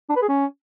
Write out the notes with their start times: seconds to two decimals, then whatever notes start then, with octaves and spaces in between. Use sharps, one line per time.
0.10 D4
0.16 B4
0.22 G#4
0.29 C#4